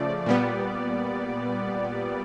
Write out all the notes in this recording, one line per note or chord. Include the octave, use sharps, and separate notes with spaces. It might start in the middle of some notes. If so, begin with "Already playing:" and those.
Already playing: C#3 F3 A3 D5
A#2 G3 B3